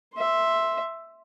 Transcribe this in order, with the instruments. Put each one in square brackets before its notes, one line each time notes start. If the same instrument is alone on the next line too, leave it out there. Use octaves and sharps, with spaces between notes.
[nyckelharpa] E5 C6